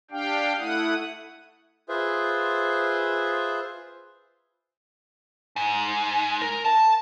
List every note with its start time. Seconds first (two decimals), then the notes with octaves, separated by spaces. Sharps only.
0.11 D4 G4 F5 G5
0.58 A3 E4 F#5 D#6
1.89 F4 G#4 B4 C5 E5
5.56 G#2
6.41 A#4
6.65 A5